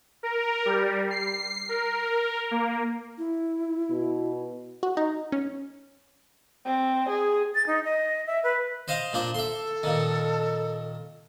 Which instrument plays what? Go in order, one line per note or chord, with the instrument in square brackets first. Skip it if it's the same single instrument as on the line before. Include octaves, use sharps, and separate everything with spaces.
[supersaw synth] A#4
G3
C7
A#4
A#3
[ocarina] E4
[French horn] B2
[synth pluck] F#4
D#4
C#4
[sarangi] C4
G#4
[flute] A6
D#4
D#5
E5
B4
[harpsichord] C5 D#5 F5
A#2 D4 C5
[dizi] A4 [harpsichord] E5 C6
[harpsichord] A#2 D#3